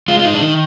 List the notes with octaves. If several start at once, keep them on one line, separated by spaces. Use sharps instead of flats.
G#3 F4
F4
D#4
D4
D#3 D#4